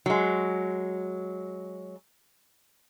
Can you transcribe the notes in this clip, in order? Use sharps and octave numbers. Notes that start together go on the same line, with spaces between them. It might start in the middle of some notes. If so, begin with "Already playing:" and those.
F#3 G#3